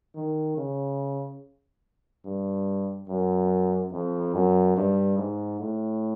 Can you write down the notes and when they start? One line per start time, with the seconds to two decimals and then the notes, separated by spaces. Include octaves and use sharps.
0.15 D#3
0.58 C#3
2.26 G2
3.09 F#2
3.93 F2
4.35 F#2
4.76 G2
5.18 G#2
5.60 A2